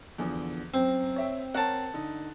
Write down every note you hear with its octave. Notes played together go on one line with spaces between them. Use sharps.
E2 D3 F3
F#2 C4
C#5 E5 G5
C4 A#4 C#5 F#5 A5
D3 D#4